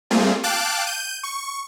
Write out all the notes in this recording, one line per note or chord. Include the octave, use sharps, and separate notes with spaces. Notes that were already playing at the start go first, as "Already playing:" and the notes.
G3 A3 A#3 C4 F4 G#4
F5 G5 A5 D6 F#6 D7
G6 D#7
C#6